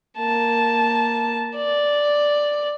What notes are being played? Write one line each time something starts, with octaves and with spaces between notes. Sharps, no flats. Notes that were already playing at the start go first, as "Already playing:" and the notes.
A#3 A5
D5